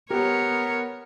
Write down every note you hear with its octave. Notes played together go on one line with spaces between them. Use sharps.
B3 G4 A#4 C#5